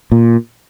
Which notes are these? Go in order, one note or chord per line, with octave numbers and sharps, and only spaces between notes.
A#2